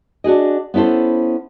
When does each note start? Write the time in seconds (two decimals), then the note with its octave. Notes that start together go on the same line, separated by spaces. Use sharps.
0.24 D4 F#4 G#4 D#5
0.74 B3 C#4 E4 A4 C5